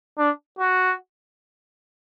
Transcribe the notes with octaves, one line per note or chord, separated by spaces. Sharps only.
D4
F#4